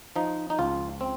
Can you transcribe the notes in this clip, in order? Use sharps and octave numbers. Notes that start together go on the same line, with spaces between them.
F3 D#4
D#4
C#2 F4
C4